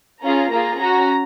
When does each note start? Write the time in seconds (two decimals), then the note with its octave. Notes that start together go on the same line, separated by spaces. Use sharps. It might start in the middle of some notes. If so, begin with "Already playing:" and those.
0.22 C#4 F4 G#4 A#5
0.51 A#3 F4 G#4 A#5
0.79 C#4 F#4 A#5